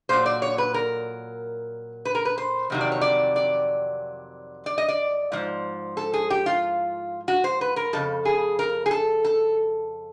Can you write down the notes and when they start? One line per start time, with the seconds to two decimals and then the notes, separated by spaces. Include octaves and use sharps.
0.09 A#2 F#3 C5
0.26 D5
0.42 C#5
0.58 B4
0.74 A#4
2.05 B4
2.15 A#4
2.25 B4
2.38 C5
2.70 F2 C3 D#3 F#3
2.81 D5
2.92 C#5
3.01 D5
3.36 D5
4.66 D5
4.78 D#5
4.89 D5
5.32 G#2 F3
5.97 A4
6.14 G#4
6.30 G4
6.46 F4
7.28 F#4
7.44 C5
7.61 B4
7.76 A#4
7.93 F2 C#3 A4
8.25 G#4
8.59 A#4
8.86 G#4
8.91 A4
9.25 A4